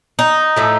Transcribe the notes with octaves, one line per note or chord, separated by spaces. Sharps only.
D#4
A2 F3 A3